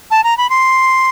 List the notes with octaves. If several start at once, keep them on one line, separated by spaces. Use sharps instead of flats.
A5
A#5
B5
C6